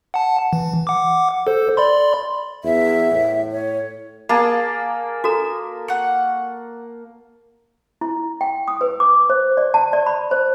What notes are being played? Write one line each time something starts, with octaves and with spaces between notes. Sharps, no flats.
F#5 A5
E3
F#5 D6
A4 C5
D5 B5 C6
E2 E5
A2
C#5
A#3 G#4 A5
F#4 A4 A#5
F#5 C#6
E4
G5
D#6
B4
D6
C5
D5
A5
D5
B5
C5